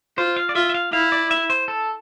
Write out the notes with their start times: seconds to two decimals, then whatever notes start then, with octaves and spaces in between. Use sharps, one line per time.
0.18 F4 C5
0.37 F5
0.49 D5
0.55 F4 E5
0.69 E5
0.74 F5
0.93 E4 F5
1.12 D5
1.31 E5
1.50 C5
1.68 A4